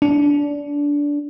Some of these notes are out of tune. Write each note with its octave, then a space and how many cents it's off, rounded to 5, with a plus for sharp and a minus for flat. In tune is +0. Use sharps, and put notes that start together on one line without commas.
D4 -20